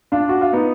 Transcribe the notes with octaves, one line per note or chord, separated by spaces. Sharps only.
D4 F4
F#4
F4
B3 D#4